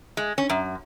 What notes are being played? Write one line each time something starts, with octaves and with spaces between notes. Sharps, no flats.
G#3
C#4
F#2